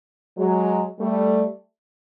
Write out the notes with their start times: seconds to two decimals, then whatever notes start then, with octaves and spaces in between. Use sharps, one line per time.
0.38 F#3 G#3
1.00 G3 A3